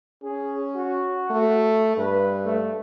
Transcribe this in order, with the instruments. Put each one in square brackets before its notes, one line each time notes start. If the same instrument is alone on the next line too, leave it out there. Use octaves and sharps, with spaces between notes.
[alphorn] C#4 [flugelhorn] G#4
[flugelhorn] F#4
[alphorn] A3
[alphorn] G2 [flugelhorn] B4
[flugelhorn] A3